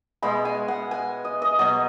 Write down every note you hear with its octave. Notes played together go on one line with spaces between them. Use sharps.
B2 G#3 B5
G#5
F#5
G#5
D#5
D#5
B2 F#3 D#5